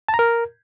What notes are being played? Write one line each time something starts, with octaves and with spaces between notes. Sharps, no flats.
A5
A#5
A#4